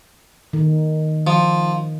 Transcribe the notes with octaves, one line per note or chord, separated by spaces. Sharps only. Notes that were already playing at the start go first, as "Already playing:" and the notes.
D#3
F3